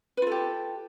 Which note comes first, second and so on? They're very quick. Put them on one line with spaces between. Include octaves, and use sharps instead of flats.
B4 F4 A4 G4